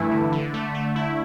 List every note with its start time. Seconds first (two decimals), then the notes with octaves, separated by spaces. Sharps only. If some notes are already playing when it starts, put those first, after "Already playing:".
Already playing: G2 E3 A3 E4
0.11 D3
0.32 D3
0.54 A3
0.75 A3
0.96 E4